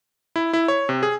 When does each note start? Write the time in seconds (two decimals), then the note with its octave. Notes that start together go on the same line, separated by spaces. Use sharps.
0.36 E4
0.53 E4
0.68 C#5
0.89 C3
1.03 G#4